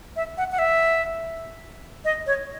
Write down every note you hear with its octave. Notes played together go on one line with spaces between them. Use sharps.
E5
F#5
F#5
E5
D#5
C#5